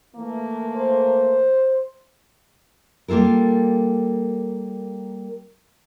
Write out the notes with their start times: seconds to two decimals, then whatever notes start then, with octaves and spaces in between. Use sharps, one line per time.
0.16 E3 A3 A#3
0.76 C5
3.08 G3 A#3 F4 A4 A#4